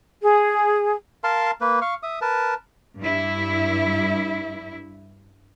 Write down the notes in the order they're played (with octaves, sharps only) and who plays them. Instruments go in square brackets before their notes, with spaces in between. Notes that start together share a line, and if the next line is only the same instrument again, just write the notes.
[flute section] G#4
[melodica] A#4 F5 A5 C6
A#3 B4
F5 C#6
E5 D#6
A#4 B4 A5
[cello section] G2 E4